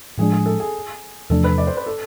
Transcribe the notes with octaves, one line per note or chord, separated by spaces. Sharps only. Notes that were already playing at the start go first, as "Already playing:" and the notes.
A2 F3 G#3 D4 G#4
G#4
A4
G#4
E2 C3 F3 A3 D4 A4
B4
D5
C5
B4
A4